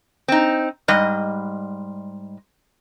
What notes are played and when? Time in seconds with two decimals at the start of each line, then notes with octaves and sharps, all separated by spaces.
0.28 C4 D#4
0.88 G#2 G3 D#5